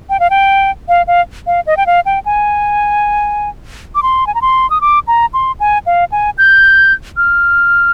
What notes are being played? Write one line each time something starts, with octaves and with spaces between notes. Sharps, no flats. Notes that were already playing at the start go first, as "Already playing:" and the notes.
G5
F5
G5
F5
F5
F5
D#5
G5
F5
G5
G#5
D6
C6
G#5
A#5
C6
D#6
D6
A#5
C6
G#5
F5
G#5
G6
F6